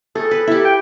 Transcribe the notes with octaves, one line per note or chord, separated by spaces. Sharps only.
G#4 A4
B4
E4 G4
G5